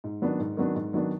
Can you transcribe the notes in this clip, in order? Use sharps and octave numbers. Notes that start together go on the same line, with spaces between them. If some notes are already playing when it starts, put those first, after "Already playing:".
G#2
D#3 F#3 B3 D4
G#2
D#3 F#3 B3 D4
G#2
D#3 F#3 B3 D4